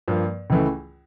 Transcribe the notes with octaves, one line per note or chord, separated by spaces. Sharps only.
G2 F3 A#3
C#2 C#3 E3 A3